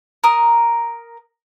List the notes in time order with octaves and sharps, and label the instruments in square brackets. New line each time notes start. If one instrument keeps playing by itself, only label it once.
[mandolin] A#4 D#6